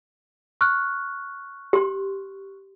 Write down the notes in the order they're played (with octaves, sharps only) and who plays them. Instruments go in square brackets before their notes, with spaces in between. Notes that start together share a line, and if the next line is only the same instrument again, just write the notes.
[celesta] C#6 F6 F#6
[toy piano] G4 C6